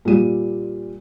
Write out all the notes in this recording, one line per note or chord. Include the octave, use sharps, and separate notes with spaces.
A#2 G3 D#7